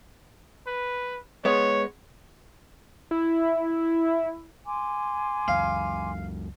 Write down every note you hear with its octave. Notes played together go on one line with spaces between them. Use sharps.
B4
G#3 B3 C#5
E4
G#5 C6 D6
C#2 F#2 F5